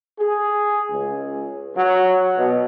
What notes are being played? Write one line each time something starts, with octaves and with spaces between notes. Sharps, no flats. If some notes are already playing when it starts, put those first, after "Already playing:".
G#4
C#2
F#3
B2